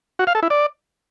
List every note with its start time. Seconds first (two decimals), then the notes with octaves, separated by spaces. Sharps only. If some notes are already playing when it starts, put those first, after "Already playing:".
0.19 F#4
0.27 F5
0.35 A4
0.43 E4
0.50 D5